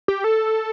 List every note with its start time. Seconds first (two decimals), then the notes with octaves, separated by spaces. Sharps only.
0.08 G4
0.24 A4